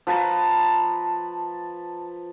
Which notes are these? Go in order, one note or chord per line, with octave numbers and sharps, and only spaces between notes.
F3 B4 A5 A#5